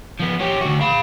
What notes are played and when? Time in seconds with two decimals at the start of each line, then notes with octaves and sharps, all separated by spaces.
0.19 F3 B3
0.40 C#4 G4
0.61 D2 F#4
0.81 F5 B5